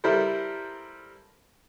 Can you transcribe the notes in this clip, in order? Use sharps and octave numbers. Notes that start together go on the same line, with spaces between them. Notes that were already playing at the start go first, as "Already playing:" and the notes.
G3 E4 A4 A#4 C5